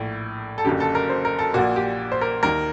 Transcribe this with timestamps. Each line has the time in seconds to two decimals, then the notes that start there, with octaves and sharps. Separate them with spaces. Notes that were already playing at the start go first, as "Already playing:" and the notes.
Already playing: A#1 A2
0.58 A4
0.65 F#1 F#2 D3 G4
0.80 A4
0.95 A#4
1.10 C5
1.25 A#4
1.39 A4
1.54 A#1 A#2 F#4
1.76 G4
2.12 C5
2.21 A#4
2.43 D#2 D#3 A#4